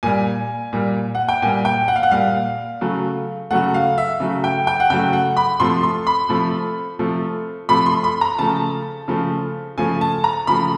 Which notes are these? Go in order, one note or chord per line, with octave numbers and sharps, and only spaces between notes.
A#2 G3 G#5
A#2 G3
F#5
G5
A#2 G3 G#5
G5
F#5
F5
F#5
A#2 G3 F5
C#3 F#3 A3
C#3 F#3 A3 F#5
F5
E5
C#3 F#3 A3
G5
G5
F#5
C#3 F#3 A3 G5
F#5
B5
C3 F3 A3 C6
C6
B5
C3 F3 A3
C3 F3 A3
C3 F3 A3 B5
C6
B5
A#5
C#3 F3 A3 A5
C#3 F3 A3
C#3 F3 A3 G#5
A5
A#5
C#3 F3 A3 B5